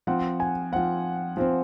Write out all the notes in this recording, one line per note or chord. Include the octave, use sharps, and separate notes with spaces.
F3 C4 F#5
G#5
F3 C4 F#5
F3 C4